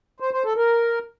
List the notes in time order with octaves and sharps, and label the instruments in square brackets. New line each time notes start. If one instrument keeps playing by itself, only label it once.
[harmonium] C5
C5
A4
A#4